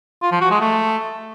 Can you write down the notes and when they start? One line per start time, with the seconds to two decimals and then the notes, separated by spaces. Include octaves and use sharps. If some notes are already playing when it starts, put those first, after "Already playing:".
0.22 F4
0.31 F3
0.41 F#4
0.50 G#3
0.60 A3